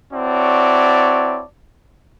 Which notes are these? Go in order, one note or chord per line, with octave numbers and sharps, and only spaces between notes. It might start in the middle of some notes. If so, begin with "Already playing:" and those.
C4 E4 F#4 C#5 D5 A5